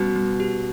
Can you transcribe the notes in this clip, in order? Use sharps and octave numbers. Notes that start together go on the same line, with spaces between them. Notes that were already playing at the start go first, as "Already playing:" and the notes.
Already playing: B2 G3 C#4
G3
G4